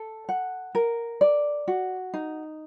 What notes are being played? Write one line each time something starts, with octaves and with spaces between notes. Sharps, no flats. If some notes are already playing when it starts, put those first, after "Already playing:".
Already playing: A4
F#5
A#4
D5
F#4
D#4